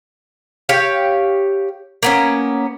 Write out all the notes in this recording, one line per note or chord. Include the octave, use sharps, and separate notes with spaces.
G4 C#5 F5
A#3 B3 C#4